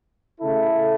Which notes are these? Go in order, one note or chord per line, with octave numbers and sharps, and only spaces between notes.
C#3 A3 E4 A4